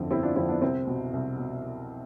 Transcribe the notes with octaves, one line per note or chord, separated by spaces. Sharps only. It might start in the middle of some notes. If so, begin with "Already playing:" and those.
Already playing: G1 F2 D3 C4 E4
G1 C4 E4
D4 F4
F2 D3 C4 E4
B3 D4
C2 C4
B2
C2
B2